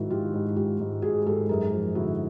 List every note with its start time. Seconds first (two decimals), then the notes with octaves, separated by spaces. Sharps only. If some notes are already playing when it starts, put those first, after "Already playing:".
Already playing: G#2 D#3 E4 F#4
0.10 D#3 F4 G4
0.34 G#2
0.56 G#2 F4 G4
0.79 G#2
1.02 G#2 F#4 G#4
1.26 G#2 G4 A4
1.49 F#2 G#4 A#4
1.72 F3
1.95 D3 E4 F#4